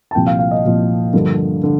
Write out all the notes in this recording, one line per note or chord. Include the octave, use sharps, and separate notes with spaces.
A5
C2 A#2 F3 G5
F5
F5
D#5
C2 A#2 F3
G2 D3 F3 A#3
D3